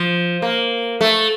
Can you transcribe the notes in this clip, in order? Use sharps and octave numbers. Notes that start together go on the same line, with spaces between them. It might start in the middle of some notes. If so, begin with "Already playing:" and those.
Already playing: F3
A#3
A3